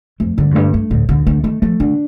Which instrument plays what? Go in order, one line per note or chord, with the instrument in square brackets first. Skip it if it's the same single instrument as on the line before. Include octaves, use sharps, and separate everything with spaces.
[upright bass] F2 [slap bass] A3
[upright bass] G2 [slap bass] D3
[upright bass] F2
[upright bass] G2 [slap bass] A3
[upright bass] G2 [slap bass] A3
[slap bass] D2 [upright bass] A2
[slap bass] D2 [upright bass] D3
[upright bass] D3 [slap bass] A3
[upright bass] D#3 [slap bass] A3
[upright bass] F3 [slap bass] A3
[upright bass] D3 [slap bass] D4